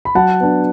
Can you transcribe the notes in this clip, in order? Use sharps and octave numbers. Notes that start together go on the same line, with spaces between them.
B5
F#3 F#5 A5
B3 D4